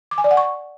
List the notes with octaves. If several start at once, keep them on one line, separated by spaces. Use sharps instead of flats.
D6
G#5
D5
F#5
C#6